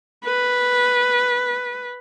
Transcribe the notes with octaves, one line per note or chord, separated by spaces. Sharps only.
B4